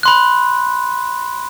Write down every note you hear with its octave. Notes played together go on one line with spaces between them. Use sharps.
B5 C6 F#6